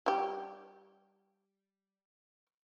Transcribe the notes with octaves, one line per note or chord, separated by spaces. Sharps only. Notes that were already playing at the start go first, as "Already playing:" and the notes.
G3 G4